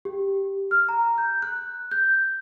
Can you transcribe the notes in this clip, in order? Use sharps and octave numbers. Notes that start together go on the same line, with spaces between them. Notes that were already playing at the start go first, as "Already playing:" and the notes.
G4
F6
A#5
G6
F#6
G6